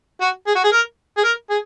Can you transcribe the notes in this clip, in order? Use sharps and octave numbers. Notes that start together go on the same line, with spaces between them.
F#4
G#4
F#4
G#4
A#4
G#4
A#4
G#4